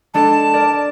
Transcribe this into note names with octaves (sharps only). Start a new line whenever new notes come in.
G#3 D4 A4 A5
A#4 D5
A5